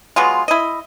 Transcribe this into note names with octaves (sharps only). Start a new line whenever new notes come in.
F#3 G#3 B3 F4
E4 D#5